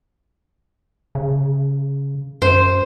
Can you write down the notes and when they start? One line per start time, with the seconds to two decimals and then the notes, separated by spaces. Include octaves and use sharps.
1.15 C#3
2.42 F#2 C5